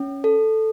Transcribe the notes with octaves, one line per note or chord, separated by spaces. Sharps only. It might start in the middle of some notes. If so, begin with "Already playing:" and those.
Already playing: C#4
A4